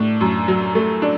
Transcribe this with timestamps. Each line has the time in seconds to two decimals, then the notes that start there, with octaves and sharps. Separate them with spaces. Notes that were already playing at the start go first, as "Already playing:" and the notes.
Already playing: A2 D4
0.21 F#2
0.48 F#3
0.75 A3
1.02 D4